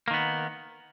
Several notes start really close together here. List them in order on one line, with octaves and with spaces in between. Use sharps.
A#3 D#3 B3